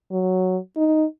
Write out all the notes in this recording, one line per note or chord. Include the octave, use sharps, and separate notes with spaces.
F#3
D#4